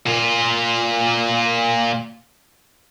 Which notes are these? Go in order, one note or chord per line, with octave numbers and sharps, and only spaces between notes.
A#2 F4